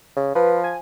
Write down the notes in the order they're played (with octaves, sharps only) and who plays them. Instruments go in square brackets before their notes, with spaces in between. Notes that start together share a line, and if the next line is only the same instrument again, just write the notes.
[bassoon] C#3
[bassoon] F3 [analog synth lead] B4
[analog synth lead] G#5